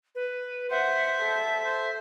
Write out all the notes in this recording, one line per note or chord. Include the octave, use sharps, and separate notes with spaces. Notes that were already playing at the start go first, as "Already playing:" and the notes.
B4
C5 E5 F#5
A4
C5